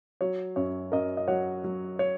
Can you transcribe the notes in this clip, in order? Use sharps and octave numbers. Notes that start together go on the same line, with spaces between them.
F#3 C#5
F#2 C#5
F#2 A#4 D#5
D#5
F#3 C#5 F#5
F#3
C#5